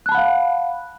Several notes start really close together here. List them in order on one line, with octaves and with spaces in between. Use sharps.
F#6 A5 B5 F#5 F5